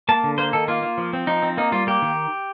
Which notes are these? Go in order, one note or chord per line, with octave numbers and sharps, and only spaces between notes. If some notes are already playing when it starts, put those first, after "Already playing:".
A#3 A5
D3
A#3 C5
D#3 A4
A#3 F4
A#3
F3
C4
F3 D#4
C4
A#3 D#4
G3 F4
A#3 G4
D#3